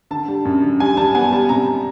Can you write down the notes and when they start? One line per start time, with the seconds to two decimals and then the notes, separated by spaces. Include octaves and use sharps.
0.11 D3 A5
0.28 G3
0.45 F#2
0.63 D3
0.80 G3 G#5
0.97 G3 A5
1.15 B3 G#5
1.32 G3 A5
1.49 C3 A#5